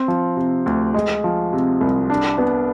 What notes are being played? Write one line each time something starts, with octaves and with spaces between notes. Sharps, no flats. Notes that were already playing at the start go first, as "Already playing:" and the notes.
Already playing: C4
F3
C3
D2
G#3
F3
C3
C2
D4
B3